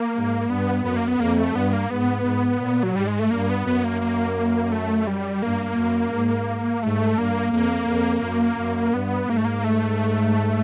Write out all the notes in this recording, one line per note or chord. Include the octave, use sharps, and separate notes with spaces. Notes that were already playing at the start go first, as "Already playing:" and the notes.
Already playing: A#3
G#2
G2 B3
F#2 B3
A#3
B3
F2 A#3
A3
G2 B3
A#3
G#2 B3
G#2
A#2
F#3
G#2 G3
G#3
A3
G2 A#3
B3
F#2 B3
A#3
A#3
A3
G3
G2 A#3
F#2
G#2
G#2 A3
G2 A#3
F2 A#3
F2
F#2
F#2
G2 B3
G#2 A#3
A3
A#3
A3